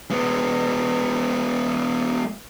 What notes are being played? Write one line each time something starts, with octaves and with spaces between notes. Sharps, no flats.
G#3 B3